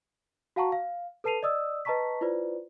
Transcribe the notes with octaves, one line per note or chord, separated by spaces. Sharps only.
F#4 F5 F#5 A5 A#5 C#6
F5
A4 B4 A5 C7 D#7 F7
D5 D#5 D#6 E6
B4 D#5 A5 A#5 C#6 B6
E4 F4 B4 C5 D5